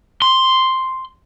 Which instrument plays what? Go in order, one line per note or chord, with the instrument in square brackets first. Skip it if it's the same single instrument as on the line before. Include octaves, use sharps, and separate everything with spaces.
[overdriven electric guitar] C6